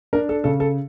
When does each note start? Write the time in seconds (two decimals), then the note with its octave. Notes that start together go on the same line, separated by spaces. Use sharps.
0.13 D4 A#4
0.29 A4
0.44 C#3 A4
0.60 A4